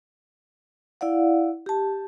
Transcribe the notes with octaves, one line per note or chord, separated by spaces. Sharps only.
E4 D5 F5 F#5
G4 A5